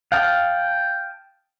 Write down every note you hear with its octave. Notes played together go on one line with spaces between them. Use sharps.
F5 G5 A5 D#6